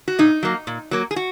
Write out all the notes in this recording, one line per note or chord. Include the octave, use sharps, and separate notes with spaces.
F#4
A#2 D#4
F#3 A#3
A#2
F#3 A#3
G#4
F#4